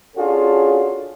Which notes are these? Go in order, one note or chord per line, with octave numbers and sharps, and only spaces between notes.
C#4 D4 F4 F#4 G#4 A4